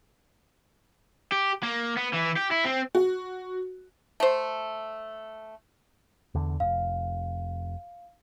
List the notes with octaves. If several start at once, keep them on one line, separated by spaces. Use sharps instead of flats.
G4
A#3
B3
E3
G4
E4
C4
F#4
A3 C5
E2 D3
F1 F5